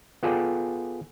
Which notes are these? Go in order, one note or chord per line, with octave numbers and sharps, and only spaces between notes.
B3 F4 G#4 A4 D5 G5